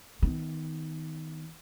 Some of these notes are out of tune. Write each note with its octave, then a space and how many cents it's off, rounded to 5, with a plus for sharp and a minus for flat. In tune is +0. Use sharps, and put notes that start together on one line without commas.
D#3 +20 B3 +15